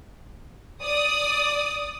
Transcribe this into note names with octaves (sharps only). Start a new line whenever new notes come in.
D5 D#6